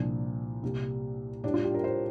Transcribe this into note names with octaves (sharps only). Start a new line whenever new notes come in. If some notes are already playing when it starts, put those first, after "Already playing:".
Already playing: C2 A#2 F3 D4
C2 A#2 G3
A2 G3 D4
F4
G4
A#4
C5